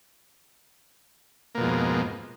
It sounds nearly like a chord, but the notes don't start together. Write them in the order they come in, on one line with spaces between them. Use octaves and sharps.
A#3 B2 F2 G#2